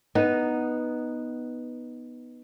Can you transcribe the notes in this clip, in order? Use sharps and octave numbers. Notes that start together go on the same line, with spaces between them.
B3 D#4